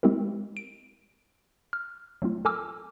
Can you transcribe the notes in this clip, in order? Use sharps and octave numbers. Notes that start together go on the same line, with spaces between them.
G#3 C4 E4 G4 A#4
D7
F6
F#3 A3 C4 F4
A4 A#4 G#5 D6 E6 F6